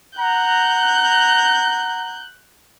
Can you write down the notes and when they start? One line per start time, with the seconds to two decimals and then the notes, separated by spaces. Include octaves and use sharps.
0.19 F#5 A#5 F#6 G6